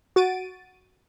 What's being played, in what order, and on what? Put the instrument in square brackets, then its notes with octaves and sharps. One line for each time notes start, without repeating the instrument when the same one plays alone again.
[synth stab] F#4 A6 D7 D#7